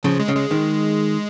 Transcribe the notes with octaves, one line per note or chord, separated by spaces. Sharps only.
C#3 F3
G#3
C#3
G#3
D#3